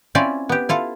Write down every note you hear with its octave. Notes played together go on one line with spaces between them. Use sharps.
C4 C#4 E4 F4 D5 E5
B3 G4
E4 F4 A4 F5